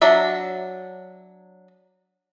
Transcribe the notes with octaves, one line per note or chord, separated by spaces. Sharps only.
F#3 D4 E5